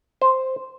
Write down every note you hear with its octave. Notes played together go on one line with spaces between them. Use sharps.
C5